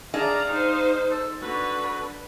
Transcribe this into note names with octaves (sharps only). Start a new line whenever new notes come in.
D4 G#4 D5 D#5 F5 A#5
D#4 C5
A4
D3 F#4 B4